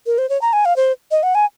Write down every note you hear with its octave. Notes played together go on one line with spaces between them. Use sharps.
A#4
C5
C#5
A#5
G#5
F5
C5
D#5
F#5
G#5